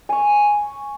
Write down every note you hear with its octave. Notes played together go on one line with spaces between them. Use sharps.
G#5 C#6